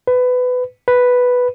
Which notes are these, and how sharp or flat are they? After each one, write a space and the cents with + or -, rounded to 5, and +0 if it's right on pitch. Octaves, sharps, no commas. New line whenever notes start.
B4 +20
B4 +0